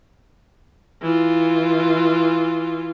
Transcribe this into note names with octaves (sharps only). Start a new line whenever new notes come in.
E3 F4